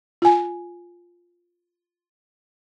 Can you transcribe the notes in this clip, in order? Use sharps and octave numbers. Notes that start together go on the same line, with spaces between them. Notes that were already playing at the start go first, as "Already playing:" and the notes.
F4 G#5